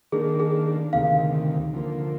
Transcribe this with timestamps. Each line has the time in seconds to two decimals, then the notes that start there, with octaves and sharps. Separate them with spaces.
0.12 D#3 A#3 D4 G#4
0.40 G#4
0.93 D2 C3 D#3 F5
1.73 D3 F3 A#3